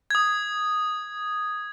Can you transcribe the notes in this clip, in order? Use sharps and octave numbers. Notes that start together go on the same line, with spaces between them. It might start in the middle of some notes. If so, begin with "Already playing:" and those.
D#6 G#6